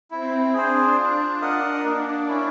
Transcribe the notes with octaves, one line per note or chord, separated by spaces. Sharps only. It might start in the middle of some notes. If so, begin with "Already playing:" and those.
C4 E4
D4 G#4 C5
F4
A#4 D#5 F#5
A#3
C#4 E4